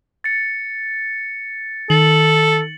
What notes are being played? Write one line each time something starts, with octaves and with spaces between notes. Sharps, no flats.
A6 C#7
D#3 A4 F#7